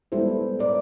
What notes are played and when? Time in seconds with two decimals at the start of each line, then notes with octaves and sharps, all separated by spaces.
0.12 G3 G#3 B3 E4 A4 C5
0.59 A#4 D5